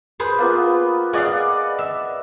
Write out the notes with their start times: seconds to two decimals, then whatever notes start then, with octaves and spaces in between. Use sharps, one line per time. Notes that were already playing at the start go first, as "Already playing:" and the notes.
0.20 G#4 B4 C5
0.39 A#3 B3 F4
1.13 G#4 D5 D#5 F5 F#5
1.79 E5